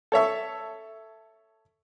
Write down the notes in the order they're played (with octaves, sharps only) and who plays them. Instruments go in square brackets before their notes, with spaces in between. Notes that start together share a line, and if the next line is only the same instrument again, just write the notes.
[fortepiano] A4 C#5 E5 C#6